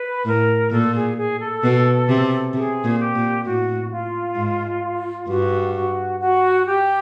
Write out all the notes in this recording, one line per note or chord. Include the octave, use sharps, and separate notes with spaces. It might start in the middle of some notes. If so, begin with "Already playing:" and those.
Already playing: B4
A2 A#4
A#2 A4
G#4
G#4
A4
B2
C3
C3 G#4
A#2
G4
A#2
A2 F#4
F4
G#2
G2 F#4
F#4
F#4
G4